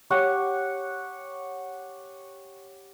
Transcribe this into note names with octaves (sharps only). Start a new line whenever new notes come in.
G4 C#5 F#5